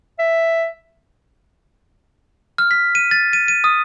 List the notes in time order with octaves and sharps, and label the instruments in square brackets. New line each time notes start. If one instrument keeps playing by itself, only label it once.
[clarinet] E5
[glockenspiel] F6
B6
D#7
A6
D#7
D#7
D#6